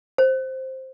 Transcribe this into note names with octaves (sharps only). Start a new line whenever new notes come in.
C5